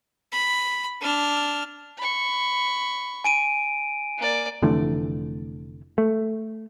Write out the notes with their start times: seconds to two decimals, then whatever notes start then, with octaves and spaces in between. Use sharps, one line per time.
0.32 B5
1.01 D4 F6
1.97 B5 C#6
3.24 G#5 D7 D#7
4.18 A#3 D5
4.62 F1 D3 E3 A3
5.98 A3